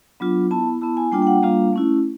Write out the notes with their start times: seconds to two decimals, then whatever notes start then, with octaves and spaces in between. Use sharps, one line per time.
0.20 F#3 B3 D4 F4
0.51 B3 E4 A5
0.81 B3 E4 A5
0.97 G#5
1.12 G3 A#3 D4 F4 G5
1.22 G5
1.27 F#5
1.43 G3 A#3 D4 F4 F5
1.73 A3 C#4 E4